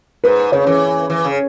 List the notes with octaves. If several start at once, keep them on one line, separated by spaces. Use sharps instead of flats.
G#2 B4
C#3 C#5
E3
E3
C#3